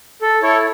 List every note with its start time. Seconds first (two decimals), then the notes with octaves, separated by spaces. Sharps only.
0.22 A4
0.42 E4 A4 C#5